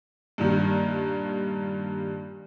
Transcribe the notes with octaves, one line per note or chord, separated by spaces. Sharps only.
G2 A#2 D#3 G3